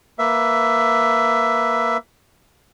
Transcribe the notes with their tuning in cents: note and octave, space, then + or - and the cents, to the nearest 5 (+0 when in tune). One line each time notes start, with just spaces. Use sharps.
A#3 +0 B4 +0 E5 +10